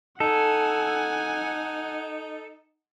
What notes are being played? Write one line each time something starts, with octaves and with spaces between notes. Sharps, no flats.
D#4 A4 F#5 G#5